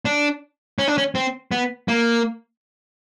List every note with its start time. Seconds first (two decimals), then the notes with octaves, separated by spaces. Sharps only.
0.05 D4
0.79 C#4
0.88 D4
0.98 C#4
1.15 C4
1.52 B3
1.88 A#3